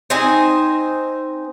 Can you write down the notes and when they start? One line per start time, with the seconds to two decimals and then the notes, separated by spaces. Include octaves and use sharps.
0.10 C4 D#4 C5 G#5